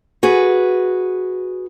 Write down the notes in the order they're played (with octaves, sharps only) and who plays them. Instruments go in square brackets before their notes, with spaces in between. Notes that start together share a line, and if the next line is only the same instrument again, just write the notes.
[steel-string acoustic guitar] F#4 G#4 B4